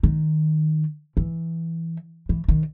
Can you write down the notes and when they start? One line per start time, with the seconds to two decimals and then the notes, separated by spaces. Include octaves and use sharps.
0.03 D#3
1.17 E3
2.29 E3
2.48 D#3